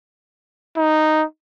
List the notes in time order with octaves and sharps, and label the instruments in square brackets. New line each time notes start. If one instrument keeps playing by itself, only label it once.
[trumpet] D#4